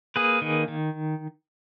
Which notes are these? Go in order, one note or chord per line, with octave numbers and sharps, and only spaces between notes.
A#3 G#4 B4
D#3
D#3